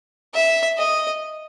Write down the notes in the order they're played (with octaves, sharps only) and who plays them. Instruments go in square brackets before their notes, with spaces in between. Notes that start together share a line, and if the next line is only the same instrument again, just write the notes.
[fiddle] E5
D#5